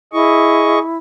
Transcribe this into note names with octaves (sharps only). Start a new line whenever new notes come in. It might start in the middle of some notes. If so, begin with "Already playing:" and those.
E4 G#4 D#5 C#6